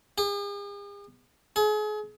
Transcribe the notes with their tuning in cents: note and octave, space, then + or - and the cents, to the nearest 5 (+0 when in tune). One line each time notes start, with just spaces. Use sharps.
G#4 -45
G#4 +35